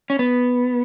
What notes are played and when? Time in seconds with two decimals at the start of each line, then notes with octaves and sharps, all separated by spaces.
0.10 C#4
0.19 B3